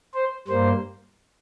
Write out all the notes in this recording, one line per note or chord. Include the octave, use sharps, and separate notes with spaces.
C5
G2 G3 A#3 C5